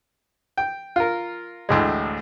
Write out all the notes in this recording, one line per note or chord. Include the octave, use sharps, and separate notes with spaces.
G5
F4 A#4
A1 D2 A2 G#3